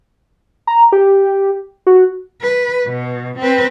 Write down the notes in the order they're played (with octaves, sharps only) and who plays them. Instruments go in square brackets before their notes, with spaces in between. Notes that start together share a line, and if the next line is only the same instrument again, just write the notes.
[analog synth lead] A#5
G4
F#4
[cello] B4
B2
C4 B4